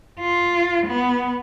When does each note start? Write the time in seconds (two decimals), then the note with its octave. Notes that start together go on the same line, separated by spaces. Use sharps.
0.20 F4
0.86 B3